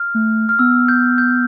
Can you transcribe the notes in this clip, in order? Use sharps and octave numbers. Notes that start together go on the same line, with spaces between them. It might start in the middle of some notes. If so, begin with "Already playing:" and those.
Already playing: F6
A3
F6
B3 E6
G6
G6